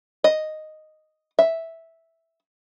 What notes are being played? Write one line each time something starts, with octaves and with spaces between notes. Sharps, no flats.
D#5
E5